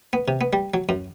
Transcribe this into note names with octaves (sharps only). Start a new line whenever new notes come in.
B3
C3
B3
G3
F#3
F#2